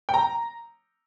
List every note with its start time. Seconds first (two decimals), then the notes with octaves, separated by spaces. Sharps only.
0.09 G5
0.14 A#5